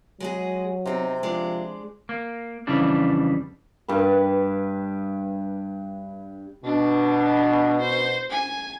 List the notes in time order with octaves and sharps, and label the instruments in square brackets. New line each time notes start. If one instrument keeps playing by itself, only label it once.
[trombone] F#3 [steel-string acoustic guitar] G#3 F#4 G#4
[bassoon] C3 [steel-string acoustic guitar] C4 D#4
[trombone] F3 [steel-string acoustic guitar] G#3 D4 C5
[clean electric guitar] A#3
F2 C#3 E3 G3 D4
[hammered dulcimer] G2 B4
[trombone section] B2 [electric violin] D4
[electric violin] C5
G#5